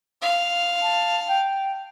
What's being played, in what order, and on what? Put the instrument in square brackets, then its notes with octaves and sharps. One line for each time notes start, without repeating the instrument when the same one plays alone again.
[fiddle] F5
[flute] A5
G5